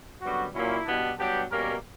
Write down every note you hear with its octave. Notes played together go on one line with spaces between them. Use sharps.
F#2 D3 G3 B3 F#4
A#2 F#3 A#3 C#4 E4
B2 G3 B3 D4
G2 F#3 B3 D4 G4
B2 G3 A#3 C#4 A#4